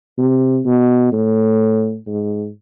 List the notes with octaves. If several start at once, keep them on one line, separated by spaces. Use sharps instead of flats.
C3
B2
A2
G#2